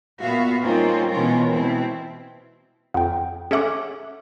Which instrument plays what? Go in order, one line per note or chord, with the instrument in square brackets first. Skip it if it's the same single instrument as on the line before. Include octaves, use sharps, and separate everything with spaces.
[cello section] A#2 B3 F#4 E5 F5
G3 A#3 C4 C#4 D#4 F4
B2 E3 G#3 C#4 F4 A#4
B2 C4 E4
[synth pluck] F2 [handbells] F#5 G5
[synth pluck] C#4 A4 F#5 [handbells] G#4 E5 D6